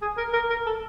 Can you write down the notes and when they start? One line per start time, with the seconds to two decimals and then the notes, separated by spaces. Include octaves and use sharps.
0.02 G#4
0.17 A#4
0.33 A#4
0.50 A#4
0.66 A4